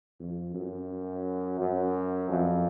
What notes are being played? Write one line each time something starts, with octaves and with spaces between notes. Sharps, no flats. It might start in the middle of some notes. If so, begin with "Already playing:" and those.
F2
F#2
F#2
F2